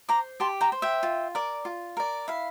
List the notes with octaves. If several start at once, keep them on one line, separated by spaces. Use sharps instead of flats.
C5 A#5 D6
G4 A5 C6
G5 A#5
C5
E5 G5
F4
A#4 D5
F4
A#4 D5
E4 F5